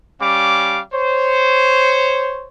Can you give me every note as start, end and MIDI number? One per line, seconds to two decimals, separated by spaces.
0.20 0.81 55
0.20 0.81 61
0.20 0.81 77
0.20 0.81 86
0.93 2.49 72
0.93 2.49 73